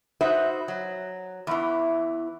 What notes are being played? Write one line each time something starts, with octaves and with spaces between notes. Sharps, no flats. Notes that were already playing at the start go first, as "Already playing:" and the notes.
D#4 F#4 B4 C5 E5
F#3
E2 E3